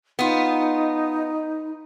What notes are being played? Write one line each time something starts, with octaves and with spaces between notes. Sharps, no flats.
B3 D#4 F4